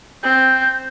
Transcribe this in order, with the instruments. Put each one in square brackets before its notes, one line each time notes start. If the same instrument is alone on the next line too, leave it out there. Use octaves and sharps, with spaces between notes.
[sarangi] C4 [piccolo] G6